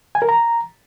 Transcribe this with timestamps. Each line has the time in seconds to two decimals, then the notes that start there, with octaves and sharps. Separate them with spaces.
0.15 G#5
0.22 A#4
0.29 A#5